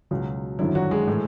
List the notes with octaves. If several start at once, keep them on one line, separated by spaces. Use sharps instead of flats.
C#2 B2 F#3
G#1 F#2 D3 F#3 E4
F#3 F#4
G#3 G#4
A2 E3